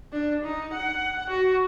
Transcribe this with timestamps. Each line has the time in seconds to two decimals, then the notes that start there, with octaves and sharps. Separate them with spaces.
0.13 D4
0.45 D#4
0.74 F#5
1.30 F#4